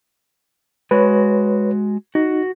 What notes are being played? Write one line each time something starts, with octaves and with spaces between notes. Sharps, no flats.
G#3 F#4 B4 C#5
D#4 F#4